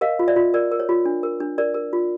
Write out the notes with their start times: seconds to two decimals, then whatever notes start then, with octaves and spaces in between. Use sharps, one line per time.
0.01 A#4 D#5 F5
0.19 F4
0.28 D5 E5
0.36 F4
0.54 A#4 D5
0.72 A#4
0.80 C#5
0.89 F4
1.05 D4
1.23 A#4
1.40 D4
1.58 A#4 D5
1.74 A#4
1.93 F4